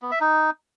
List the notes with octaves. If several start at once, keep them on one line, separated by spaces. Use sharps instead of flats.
B3
E5
D#4